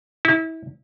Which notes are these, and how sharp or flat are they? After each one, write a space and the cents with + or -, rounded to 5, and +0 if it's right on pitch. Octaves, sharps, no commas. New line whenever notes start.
E4 -30